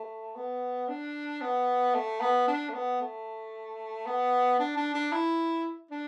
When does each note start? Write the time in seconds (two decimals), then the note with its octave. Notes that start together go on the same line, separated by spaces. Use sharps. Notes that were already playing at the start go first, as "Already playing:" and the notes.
Already playing: A3
0.35 B3
0.88 D4
1.41 B3
1.95 A3
2.21 B3
2.47 D4
2.69 A3
2.74 B3
3.01 A3
4.06 B3
4.60 D4
4.77 D4
4.94 D4
5.12 E4
5.91 D4